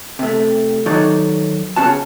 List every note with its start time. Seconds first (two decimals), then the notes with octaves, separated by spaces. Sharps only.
0.19 C3 A3
0.86 D#3 F#3 D#4 F#4 A4 D5
1.76 C#3 C#4 F#4 A5